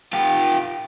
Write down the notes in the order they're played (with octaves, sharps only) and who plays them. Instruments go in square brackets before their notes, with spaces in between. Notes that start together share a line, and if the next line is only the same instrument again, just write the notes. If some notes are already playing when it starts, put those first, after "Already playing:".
[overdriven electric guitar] F4 G4